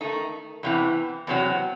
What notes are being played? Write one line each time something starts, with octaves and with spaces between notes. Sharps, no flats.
D#3 A3 D#4
E2 C3 E3
E2 C3 F#3